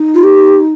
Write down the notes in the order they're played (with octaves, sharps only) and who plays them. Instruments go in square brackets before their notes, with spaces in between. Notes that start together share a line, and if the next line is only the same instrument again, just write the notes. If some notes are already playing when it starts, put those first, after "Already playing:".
Already playing: [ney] D#4
[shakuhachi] F4
G4